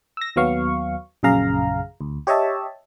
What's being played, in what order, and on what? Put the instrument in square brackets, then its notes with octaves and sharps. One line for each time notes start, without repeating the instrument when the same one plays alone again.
[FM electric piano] E6 A#6
D#2 F#3 B3 F5 C#6
A#1 F#2 C#3 G#4 F5 A#5
D2
G4 C#5 D#5 E5 A5